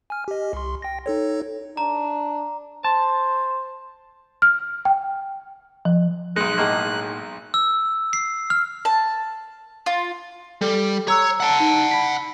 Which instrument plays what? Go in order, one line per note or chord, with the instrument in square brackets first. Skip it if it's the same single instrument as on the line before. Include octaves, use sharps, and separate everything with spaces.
[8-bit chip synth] G#5 F6
G4 D#5
C2 C6
G5 A#6
D#4 A4 C#5
[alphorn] D4 [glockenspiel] A#5
[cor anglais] C5 [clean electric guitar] A5
[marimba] F6
G5
F3
[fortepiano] B1 G#3 [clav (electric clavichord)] D#4 [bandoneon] F#6
[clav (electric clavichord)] A2 A#3 [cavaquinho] D#4 G#4 F#5
[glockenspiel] E6
C7
F6
[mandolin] A5
F4
[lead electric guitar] G3 [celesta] A4
[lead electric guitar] C#5 [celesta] A#5 E6 F#6
[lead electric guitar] F#5 A5
[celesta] D#4
B5 B6